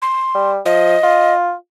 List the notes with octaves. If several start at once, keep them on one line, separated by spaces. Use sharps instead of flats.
C6
G3
F3 D#5
F4